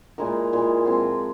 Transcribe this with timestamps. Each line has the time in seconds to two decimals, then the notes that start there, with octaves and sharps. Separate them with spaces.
0.18 A#2 G#3 E4 A#4
0.53 A#2 G#3 E4 A#4
0.86 F3 G#3 C4